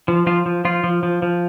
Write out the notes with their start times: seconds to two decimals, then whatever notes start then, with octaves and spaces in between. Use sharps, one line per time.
0.08 F3
0.27 F3 F4
0.46 F3
0.65 F3 F4
0.84 F3
1.03 F3
1.22 F3